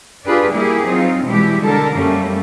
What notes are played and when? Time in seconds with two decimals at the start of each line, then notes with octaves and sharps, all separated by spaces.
0.25 D4 F4 G4 G#4 B4 D5
0.53 G3 A#3 E4 G4 G#4
0.85 F#3 C4 D#4 F4
1.26 B2 E3 G3 G#3 E4 G4
1.64 D3 A4 A#4
1.93 F#2 G3 A3 A#3 C#4